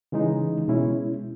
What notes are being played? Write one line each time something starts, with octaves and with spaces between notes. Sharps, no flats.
C#3 E3 G#3 D#4
B2 G#3 C#4 E4